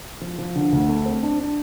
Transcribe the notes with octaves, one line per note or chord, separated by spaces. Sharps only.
F3
F3
D3
D2
A3
C4
D4
D4